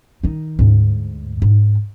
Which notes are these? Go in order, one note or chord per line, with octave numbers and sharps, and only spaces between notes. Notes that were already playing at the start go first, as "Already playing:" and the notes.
D#3 D#4
D2 G#2
G#2